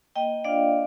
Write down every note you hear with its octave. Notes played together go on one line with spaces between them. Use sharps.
A#3 D#5 G5
D4 F4 D5 F5